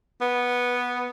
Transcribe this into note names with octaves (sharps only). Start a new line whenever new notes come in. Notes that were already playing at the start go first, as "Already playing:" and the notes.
B3